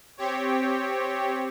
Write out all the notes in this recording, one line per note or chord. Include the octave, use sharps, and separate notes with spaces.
C4 G4 C#5